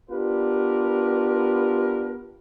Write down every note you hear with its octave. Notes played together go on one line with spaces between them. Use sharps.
B3 D4 F4 G4 A#4 B4